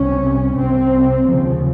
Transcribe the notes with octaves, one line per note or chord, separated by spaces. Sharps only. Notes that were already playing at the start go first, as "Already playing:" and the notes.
Already playing: C2 C3 C#4
C2 C3 C4
D#2 C#3 F3